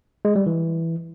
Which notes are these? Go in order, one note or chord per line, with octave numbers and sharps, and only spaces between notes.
G#3
G3
E3